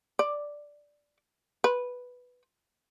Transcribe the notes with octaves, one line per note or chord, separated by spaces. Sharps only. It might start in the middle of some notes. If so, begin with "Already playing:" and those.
D5
B4